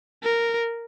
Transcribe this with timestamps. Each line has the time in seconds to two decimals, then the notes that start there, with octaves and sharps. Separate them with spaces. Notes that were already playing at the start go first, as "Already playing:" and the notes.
0.23 A#4